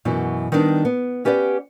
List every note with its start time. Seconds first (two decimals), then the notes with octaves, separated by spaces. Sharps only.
0.05 F#2 B2 E3
0.52 D#3 G3 B3 D4 D#4
0.85 B3
1.25 C#4 G4 B4 D5 F5 F#5